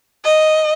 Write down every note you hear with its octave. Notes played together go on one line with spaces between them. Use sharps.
D#5